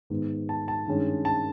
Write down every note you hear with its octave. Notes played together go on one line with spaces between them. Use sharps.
G#2 D#3 G#3 B3
A5
A5
G2 D#3 G#3 C#4
A5